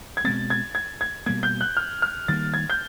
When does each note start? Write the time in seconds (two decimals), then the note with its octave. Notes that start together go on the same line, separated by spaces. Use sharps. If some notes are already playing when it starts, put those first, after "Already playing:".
0.17 G#6
0.24 B2 G#3 C4 A6
0.50 G#6
0.75 G#6
1.01 G#6
1.26 B2 G3 A#3 G#6
1.43 G6
1.61 F#6
1.77 F6
2.02 F6
2.28 D#3 G3 A#3 A6
2.54 G#6
2.70 G6